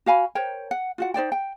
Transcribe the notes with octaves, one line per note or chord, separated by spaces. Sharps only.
F#4 F5 G#5 B5
A#4 C5 C#5 G5
F#5
F4 F#4 F#5
D#4 C5 D5 G5
G5